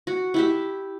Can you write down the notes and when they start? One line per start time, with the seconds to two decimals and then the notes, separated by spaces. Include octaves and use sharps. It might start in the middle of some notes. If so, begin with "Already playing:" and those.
0.07 F#4
0.34 E4 G4 E5